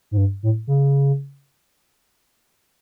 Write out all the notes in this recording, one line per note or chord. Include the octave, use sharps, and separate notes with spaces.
G#2
G2
A2
C#3